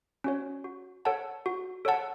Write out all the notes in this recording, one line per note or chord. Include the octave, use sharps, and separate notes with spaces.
C#4 F#4 C#5
F#4
A4 C#5 F#5 A5
F#4
A4 C#5 F#5 A5